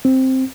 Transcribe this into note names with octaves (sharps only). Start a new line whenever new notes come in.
C4